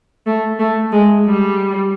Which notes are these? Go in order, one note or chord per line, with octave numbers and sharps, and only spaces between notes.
A3
A3
G#3
G3